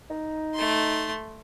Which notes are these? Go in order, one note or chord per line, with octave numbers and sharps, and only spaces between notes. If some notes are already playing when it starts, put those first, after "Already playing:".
D#4
A3 C6